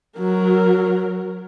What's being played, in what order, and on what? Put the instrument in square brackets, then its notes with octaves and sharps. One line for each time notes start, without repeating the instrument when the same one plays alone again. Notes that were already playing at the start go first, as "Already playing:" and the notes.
[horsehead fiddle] F#3 A#4